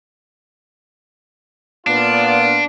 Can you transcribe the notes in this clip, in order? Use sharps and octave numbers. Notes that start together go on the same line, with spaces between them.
A#2 B3 D4 F4